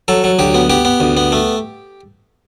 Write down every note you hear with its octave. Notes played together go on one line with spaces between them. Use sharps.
F#3 A4
F#3
D2 G4
B3
B3 G4
B3
D2
B3
A3